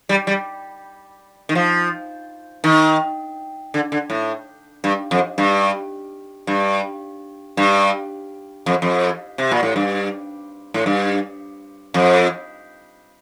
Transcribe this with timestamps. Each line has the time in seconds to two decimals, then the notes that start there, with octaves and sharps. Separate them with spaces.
0.09 G3
0.27 G3
1.49 D#3
1.55 F3
2.64 D#3
3.74 D3
3.92 D3
4.10 A2
4.84 G2
5.11 F2
5.38 G2
6.47 G2
7.57 G2
8.66 F2
8.82 F2
9.38 C3
9.51 A#2
9.63 A2
9.76 G2
10.74 A2
10.86 G2
11.94 F2